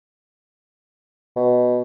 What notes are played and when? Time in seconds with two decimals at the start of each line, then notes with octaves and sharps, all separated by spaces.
1.36 B2